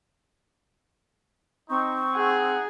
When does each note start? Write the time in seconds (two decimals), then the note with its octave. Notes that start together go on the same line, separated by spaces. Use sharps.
1.69 C4 D#4 C#6
2.15 D#4 G#4 F#5